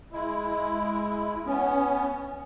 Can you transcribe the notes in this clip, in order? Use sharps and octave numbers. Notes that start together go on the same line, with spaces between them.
G#3 E4
B3 C#4